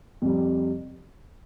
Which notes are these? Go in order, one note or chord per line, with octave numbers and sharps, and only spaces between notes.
F2 C3 G3